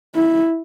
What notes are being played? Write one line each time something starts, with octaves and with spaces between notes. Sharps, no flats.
E4